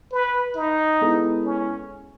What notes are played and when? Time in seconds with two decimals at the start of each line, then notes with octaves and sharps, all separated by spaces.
0.12 B4
0.56 D#4
1.01 G#3 B3 E4 A4
1.45 C#4